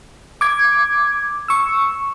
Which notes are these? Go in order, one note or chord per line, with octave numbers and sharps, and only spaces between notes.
D6 G#6
C#6 E6